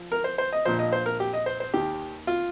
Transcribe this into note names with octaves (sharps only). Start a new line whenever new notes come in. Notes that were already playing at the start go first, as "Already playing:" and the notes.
Already playing: F3
A#4
C5
C5
D#5
A#1 A#2 F3 C5
D#5
C5
A#4
G4
D#5
C5
C5
D#2 D#3 G4
F4